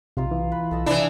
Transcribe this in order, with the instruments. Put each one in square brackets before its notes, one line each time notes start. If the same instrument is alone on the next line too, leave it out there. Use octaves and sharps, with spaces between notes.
[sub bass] B1 [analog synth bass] C3 [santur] D#4 F4 F5
[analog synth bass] E3
[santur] B4
[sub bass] B1 [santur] A4 D#5 E6
[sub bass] C3 [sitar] E3 D4 [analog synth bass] E4 [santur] G5